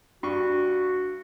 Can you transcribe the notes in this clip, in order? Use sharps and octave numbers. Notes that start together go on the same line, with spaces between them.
G2 F#4 C#6